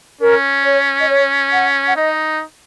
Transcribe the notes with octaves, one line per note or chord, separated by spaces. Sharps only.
C#4 A#4
C#5
D#5
C#5
F#5
F#5
D#4 D#5